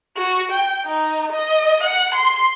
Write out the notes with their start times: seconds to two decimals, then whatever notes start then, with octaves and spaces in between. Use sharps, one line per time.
0.17 F#4
0.52 G5
0.86 D#4
1.32 D#5
1.83 F#5
2.15 C6